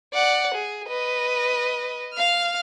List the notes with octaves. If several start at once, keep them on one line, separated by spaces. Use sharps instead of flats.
D5 F#5
G#4
B4 D#5
F5 F6